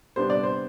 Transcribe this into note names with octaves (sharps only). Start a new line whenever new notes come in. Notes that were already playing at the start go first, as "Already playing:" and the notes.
C3 G3 B3 D4 C5
D5
C5